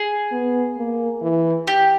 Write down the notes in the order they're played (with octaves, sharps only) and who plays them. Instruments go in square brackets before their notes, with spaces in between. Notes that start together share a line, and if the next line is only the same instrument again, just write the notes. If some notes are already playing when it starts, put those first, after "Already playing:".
Already playing: [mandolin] G#4
[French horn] B3
A#3
E3
[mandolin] G4